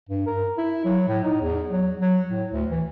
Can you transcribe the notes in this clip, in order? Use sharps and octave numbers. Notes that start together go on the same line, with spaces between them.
G2
A#4
E4
F#3
A2
D#4
E2
F#3
F#3
A2
D2
E3